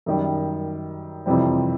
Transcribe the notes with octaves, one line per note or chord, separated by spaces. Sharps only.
F#2 D#3 G3
F2 C3 E3 G3 C4